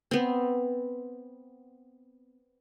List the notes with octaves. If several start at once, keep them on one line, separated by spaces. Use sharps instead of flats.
B3 C4